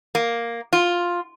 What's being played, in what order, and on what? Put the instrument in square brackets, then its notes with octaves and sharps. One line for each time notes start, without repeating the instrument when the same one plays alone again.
[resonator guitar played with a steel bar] A#3
F4